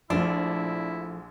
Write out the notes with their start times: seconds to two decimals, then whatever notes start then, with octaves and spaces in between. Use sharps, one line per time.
0.10 A#1 F3 A3 D4 E4 F4